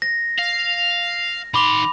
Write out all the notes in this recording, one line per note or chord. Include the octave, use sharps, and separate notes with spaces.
A#6
F5
D#3 B5 C6 D6 F7